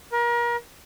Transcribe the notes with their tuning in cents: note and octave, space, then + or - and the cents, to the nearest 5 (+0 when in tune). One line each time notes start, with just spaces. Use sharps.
A#4 +35